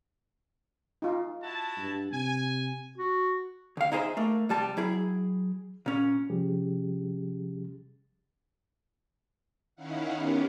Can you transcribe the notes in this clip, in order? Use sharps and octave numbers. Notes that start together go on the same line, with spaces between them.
D#4 F4
E4 F#4 A5
G2
C3 G#5
F#4
D2 F5
D#4 E4 G#4 B4 C5 E5
A3 A#3
C2 G3 A5
F#3 E4 G#4
A#2 C#4
C3 F3 G3 C#4 G4 G#4
D#3 C#4 D#4 E4 F5 F#5
B3 C#4 G4 A#4